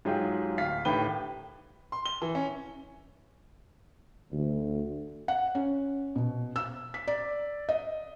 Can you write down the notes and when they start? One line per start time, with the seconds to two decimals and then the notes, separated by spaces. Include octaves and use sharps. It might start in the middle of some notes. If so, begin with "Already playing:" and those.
0.05 G#2 F#3 F4 G4 G#4
0.58 D1 F5 B6
0.85 A2 D3 D#3 G4 B4 G7
1.92 C6
2.06 G7
2.22 E3
2.35 C#4
4.32 D2
5.28 F#5
5.55 C#4
6.16 B2
6.56 E6
6.94 B6
7.08 D5
7.69 D#5